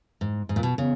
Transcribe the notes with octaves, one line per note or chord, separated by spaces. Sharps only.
G#2
G#2
A#2
B2
C#3